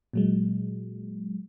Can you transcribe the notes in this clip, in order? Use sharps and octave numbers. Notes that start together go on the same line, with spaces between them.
A#2 F#3 G#3